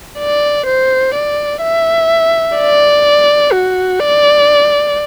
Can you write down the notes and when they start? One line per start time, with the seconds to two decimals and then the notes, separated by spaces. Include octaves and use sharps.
0.19 D5
0.67 C5
1.14 D5
1.62 E5
2.57 D5
3.52 F#4
4.00 D5